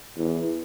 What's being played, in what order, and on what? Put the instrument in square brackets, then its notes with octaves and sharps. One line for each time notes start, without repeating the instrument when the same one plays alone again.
[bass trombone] E2